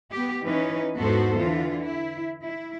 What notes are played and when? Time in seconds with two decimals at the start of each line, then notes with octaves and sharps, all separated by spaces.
0.11 B3 G4
0.43 E3 C#4 D#4 B4
0.97 E2 G#2 B3 F#4 A4 C5
1.39 D3 E3 F4
1.85 E4
2.43 E4